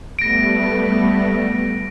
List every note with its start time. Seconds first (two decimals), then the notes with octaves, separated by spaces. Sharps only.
0.19 G3 A3 B3 A#6 D7